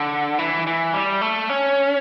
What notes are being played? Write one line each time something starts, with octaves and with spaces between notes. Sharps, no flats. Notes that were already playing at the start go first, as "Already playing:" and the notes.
Already playing: D3
E3
E3
G3
A3
C#4